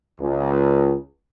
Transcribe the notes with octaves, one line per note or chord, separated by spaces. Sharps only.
C#2